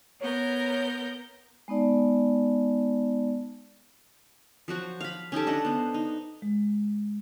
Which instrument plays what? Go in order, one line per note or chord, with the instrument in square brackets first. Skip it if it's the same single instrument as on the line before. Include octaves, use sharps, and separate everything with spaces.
[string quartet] B3 A#4 G6 [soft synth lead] C#5
[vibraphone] G#3 B3 D#4 D5 A5
[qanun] F3 F#3 F#4 C5
F5 B5
C#4 D#4 G4 A4
D4 D#5 F#5
B3 C5
D#4
[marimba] G#3